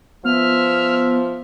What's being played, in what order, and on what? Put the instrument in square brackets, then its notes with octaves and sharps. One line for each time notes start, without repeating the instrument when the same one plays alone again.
[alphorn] F3 [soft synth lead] B3 [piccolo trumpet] E5 [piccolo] F6